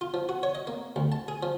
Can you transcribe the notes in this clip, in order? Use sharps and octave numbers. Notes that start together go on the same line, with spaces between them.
F4
F3
F#4
C#5
D#5
A#3
D2
A5
G#4
F3